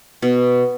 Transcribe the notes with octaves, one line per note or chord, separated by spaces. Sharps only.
B2